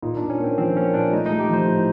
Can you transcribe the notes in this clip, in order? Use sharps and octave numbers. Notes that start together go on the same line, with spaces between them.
A#2 D#4
A#2 D4
C#4
A#3 C4
F3 C4
A#3 C#4
A#2 D4
A3 D#4
A3 D#4
G4
F3 C5
A2